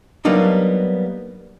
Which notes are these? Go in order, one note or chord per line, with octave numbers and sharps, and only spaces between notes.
F#3 G3 A#3 B3 D4 D#4